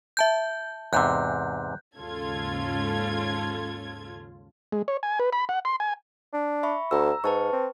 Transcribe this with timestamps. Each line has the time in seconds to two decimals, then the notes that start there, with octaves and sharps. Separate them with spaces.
0.17 E5 A5 G6
0.93 E2 G#2 C3 F#6 G6
1.98 D#2 G#2 C#3 F4 A4 G#6
4.72 G#3
4.88 C#5
5.03 G#5
5.20 B4
5.33 B5
5.49 F#5
5.65 C6
5.80 G#5
6.33 D4
6.63 E5 B5 C#6
6.91 D2 A#5 E6
7.24 G#2 B4 A5 C#6
7.53 C4